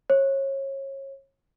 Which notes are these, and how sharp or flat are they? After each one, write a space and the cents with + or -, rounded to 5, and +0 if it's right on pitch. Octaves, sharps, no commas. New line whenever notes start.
C#5 -30